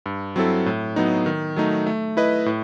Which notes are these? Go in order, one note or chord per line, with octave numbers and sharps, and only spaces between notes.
G2
F#3 C4 E4 A4
A2
F#3 B3 D#4
D#3
F#3 A3 D#4
A3
E4 B4 D#5
A2